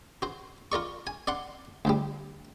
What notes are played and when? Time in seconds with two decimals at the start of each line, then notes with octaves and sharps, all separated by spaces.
0.22 F#4 C5
0.72 F4 A#4 D5 C#6
1.07 G#5
1.27 D5 F5 F#5 C6
1.85 D2 F3 G3